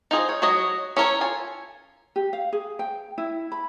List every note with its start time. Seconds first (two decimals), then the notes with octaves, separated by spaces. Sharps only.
0.11 D#4 F4 G#4 C5
0.29 C#5
0.42 F#3 F#4 C#5 D#5
0.97 C#4 A4 A#4 C#5
1.21 F4 G#5
2.16 G4
2.33 F5
2.53 G#4
2.79 G5
3.18 E4
3.52 B5